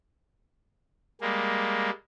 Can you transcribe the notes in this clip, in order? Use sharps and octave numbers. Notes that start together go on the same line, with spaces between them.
G3 G#3 A#3